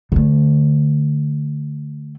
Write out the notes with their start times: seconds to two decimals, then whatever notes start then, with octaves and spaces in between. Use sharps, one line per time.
0.12 D3 A3